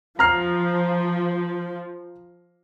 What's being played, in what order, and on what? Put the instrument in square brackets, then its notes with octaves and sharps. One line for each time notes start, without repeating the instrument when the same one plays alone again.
[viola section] F3 [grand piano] A#5 F6 C7